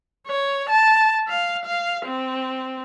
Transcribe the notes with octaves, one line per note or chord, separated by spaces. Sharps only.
C#5
A5
F5
F5
C4